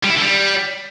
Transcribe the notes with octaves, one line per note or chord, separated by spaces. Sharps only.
G3
E4
D3
G3